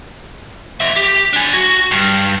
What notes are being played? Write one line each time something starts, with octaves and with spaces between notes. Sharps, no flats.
F3 E5
G4
D4 G#5
F#4
G2